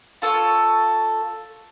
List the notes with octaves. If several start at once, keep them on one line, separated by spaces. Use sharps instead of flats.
F4 A4 C#5